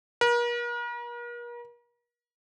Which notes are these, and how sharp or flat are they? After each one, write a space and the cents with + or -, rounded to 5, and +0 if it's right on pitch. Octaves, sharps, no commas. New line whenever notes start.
A#4 +40